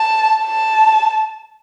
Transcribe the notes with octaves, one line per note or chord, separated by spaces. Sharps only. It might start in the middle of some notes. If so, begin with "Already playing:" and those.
Already playing: A5
A5